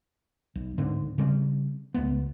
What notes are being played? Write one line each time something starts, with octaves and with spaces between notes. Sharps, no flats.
B1
D1 G#2 D3 C4
C#3 G3 C4
C#2 A3 B3